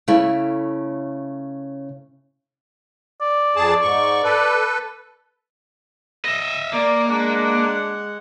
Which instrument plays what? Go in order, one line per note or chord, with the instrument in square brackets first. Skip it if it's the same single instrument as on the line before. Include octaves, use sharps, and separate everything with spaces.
[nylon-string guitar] C#3 A3 E4
[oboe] D5
[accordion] F2 G#4 A5
G#2 C#6
A4 B4
[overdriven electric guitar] D#5 E5
[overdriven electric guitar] A#3 [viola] D5
[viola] G#3 F#5 [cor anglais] D4